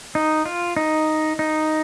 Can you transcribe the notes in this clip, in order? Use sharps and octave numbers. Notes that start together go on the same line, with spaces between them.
D#4
F4
D#4
D#4